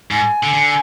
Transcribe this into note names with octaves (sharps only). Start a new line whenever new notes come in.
G#2 G#5
D3
D3